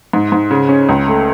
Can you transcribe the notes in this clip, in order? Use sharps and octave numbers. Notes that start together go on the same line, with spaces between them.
G#2
G#2
C#3
C#4
C#2
A3